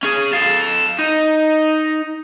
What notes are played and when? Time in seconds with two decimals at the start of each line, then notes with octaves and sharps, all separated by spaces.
0.03 C#4 G#4
0.33 A4 F5
0.99 D#4